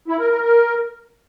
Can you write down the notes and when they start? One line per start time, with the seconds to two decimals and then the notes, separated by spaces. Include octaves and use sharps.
0.08 E4
0.19 A#4
0.30 A#4
0.41 A#4